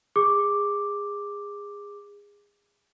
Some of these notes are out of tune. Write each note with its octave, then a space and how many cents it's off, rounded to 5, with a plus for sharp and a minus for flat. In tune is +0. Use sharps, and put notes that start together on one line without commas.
G#4 -25 D6 +0